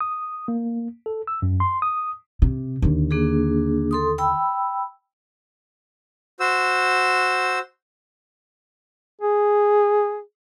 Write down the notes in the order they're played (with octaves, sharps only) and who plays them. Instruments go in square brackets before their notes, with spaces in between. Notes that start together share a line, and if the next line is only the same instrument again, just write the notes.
[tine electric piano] D#6
A#3
A4
E6
F#2
C6
D#6
[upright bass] C3
D#2 D3
[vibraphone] A#3 D4 G#4
A4 C6 D#6
G5 B5 E6
[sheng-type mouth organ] F#4 C5 E6
[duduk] G#4